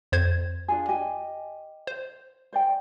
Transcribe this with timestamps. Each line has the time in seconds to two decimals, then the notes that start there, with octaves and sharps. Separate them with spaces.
0.12 F2 C5 G#6
0.68 D4 F4 G#4
0.88 G4 D#5 G#5
1.87 C5
2.53 C5 D5 G5